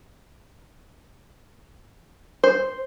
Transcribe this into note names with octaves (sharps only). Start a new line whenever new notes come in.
C5